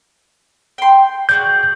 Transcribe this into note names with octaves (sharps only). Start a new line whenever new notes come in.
G5 C6
F#4 G#4 D5 G6